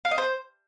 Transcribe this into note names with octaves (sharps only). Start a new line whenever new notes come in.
F5
D#5
C5